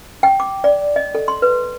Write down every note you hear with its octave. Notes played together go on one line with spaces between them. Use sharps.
G5
D6
D5
D#5
A4
C6
B4